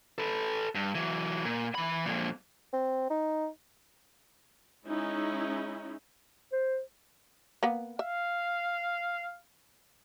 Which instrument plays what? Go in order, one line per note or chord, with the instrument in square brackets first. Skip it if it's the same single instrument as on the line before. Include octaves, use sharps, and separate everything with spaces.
[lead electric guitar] A4 B4
G2
E3 F#3
A#2
E3 B5
F2 A#2
[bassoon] C4
D#4
[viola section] G#3 C#4 D#4 E4
[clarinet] C5
[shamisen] A#3 B3
[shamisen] E5 [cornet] F5